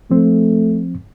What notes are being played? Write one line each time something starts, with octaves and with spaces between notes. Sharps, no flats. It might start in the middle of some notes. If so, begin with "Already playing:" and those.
F3 A3 C4